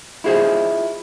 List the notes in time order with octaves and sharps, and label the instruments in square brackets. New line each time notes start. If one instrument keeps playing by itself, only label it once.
[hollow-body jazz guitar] E4 F4 G#4 C5 D#5